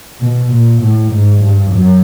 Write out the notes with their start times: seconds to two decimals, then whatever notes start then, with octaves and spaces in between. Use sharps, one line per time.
0.20 B2
0.51 A#2
0.81 A2
1.11 G#2
1.41 G2
1.70 F#2